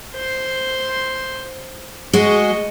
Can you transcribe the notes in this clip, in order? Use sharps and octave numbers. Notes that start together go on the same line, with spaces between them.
C5 C6
G#3 F#4 D#5 C#6